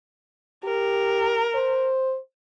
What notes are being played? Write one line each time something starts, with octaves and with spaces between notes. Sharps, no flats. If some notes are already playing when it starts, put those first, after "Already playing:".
G4 A#4
C5